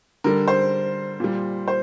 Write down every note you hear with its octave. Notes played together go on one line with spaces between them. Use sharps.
D3 G3 A#4
C5
A#2 G3
C5